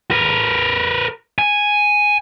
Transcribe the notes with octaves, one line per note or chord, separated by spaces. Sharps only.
A#4 B4
G#5